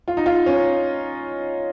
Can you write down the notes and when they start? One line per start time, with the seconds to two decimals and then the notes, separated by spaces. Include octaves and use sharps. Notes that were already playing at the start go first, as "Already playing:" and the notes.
0.08 F4
0.17 D#4
0.26 F4
0.46 C#4